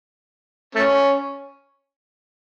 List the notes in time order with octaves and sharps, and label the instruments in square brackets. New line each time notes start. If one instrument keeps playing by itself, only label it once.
[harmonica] A3 C#4